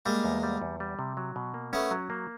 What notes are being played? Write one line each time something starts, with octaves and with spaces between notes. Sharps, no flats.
G3 G#3 A#3
E2
G3
E2
G3
C3
F#3
B2
A#3
A3 B3 C#4
F#3
A#3